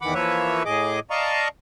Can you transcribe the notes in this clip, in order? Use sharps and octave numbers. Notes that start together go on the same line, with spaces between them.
E2 D#3 E3 F#5 B5 D6
E3 F3 A#3 B4 C#5 E5
A2 G#4 D#5 D6
D5 D#5 F5 A5 A#5 C#6